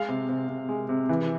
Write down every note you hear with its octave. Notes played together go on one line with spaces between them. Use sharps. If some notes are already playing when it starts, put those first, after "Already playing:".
Already playing: G#3 F5
C3
C3
C3
G#3
C3
E3